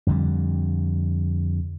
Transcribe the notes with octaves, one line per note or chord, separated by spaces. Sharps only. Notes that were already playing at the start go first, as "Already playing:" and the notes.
F2 D3 G3